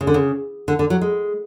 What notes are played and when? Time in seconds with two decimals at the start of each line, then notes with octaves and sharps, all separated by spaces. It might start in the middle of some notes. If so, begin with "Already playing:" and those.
0.01 C#3
0.07 D3
0.14 C#3
0.68 D3
0.79 D3
0.90 F#3
1.01 G#3